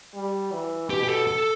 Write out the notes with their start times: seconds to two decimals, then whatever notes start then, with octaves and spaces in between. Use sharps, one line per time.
0.14 G3
0.52 E3
0.90 B2 G4
1.03 G4
1.08 A4
1.27 A4